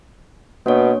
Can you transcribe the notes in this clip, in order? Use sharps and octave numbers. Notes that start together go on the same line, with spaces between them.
B2 A#3 D4 C#5